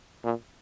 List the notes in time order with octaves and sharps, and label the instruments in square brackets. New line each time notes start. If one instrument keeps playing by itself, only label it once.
[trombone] A#2